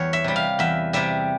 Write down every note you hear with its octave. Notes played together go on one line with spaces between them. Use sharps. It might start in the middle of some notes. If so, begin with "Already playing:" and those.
Already playing: E2 G3 C#5
E5
C3 G3
F5
E2 E5
C3 G3 E5